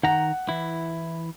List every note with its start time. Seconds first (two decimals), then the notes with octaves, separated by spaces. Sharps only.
0.03 D#3 F#5 A#5
0.49 E3 E4